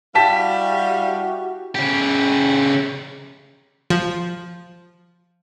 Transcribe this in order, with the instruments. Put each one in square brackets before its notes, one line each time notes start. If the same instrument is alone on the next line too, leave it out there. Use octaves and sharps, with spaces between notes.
[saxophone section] G3 F5 [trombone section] E4 F#4 G4 [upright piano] G5 A5 B6
[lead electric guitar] C#3 G4
[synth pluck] F3